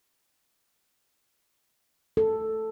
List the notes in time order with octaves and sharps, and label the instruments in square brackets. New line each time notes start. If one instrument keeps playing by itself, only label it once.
[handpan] A4